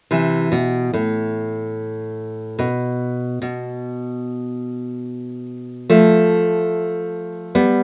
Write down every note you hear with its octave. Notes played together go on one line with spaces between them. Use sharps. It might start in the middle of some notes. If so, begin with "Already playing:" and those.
C3 E3
B2
A2
B2
B2
F3 A3
G3 B3